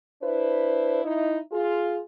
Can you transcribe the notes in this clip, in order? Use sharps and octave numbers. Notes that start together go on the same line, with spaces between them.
D4 E4 B4 C5
D#4 E4
F4 G#4